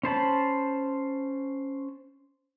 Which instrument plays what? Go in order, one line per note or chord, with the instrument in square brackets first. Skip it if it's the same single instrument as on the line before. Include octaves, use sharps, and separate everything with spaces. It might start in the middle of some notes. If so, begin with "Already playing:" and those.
[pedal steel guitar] C#4 C5 A5 B5